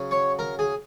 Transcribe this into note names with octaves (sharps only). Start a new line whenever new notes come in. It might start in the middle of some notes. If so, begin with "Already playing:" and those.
Already playing: C#3 F#3 C#4
C#5 C#6
A#4 A#5
G#4 G#5